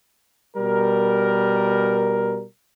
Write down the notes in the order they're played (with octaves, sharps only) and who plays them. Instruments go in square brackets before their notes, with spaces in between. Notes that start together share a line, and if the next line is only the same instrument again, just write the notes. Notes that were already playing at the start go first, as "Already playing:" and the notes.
[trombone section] B2 G3 A#4